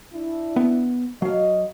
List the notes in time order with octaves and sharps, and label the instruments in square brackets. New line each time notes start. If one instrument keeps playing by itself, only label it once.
[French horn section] D4 E4
[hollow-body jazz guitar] B3
[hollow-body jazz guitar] F#3 F5 [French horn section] D#5